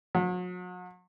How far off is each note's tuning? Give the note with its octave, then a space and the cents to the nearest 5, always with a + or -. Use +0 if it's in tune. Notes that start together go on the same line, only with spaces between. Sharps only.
F#3 -40